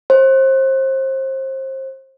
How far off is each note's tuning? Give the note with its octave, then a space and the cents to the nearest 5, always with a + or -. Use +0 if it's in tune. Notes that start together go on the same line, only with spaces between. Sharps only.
C5 +30